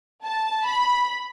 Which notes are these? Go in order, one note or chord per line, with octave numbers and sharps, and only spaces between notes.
A5
B5